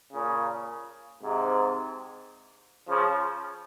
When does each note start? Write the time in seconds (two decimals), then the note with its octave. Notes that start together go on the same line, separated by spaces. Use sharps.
0.13 A#2 C#3
1.23 G#2 C3
2.88 C#3 F3